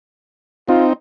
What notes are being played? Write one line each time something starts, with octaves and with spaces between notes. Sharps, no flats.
C4 D#4 F4